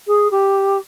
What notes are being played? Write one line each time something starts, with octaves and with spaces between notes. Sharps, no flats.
G#4
G4